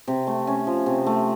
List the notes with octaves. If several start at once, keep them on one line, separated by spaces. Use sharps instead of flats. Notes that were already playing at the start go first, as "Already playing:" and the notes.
C3
A3
C#4
F3
C3
A3